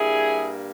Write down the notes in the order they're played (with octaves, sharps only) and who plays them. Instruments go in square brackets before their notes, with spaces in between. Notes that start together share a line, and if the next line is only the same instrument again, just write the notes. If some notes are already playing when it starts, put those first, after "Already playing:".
Already playing: [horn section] G2 G3 A#3 E4 G#4